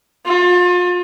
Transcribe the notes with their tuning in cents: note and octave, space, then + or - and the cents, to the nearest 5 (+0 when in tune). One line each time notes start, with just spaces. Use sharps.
F4 +35